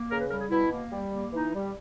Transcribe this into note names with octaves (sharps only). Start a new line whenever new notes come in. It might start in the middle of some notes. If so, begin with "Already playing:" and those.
Already playing: A#3
C#3 A#4
B4
G3 A#4
G#4
B2 E4
A#3
G3
A#3
E3 D#4
G3